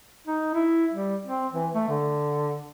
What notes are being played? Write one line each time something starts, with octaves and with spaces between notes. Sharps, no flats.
D#4
E4
G3
C4
E3
A3
D3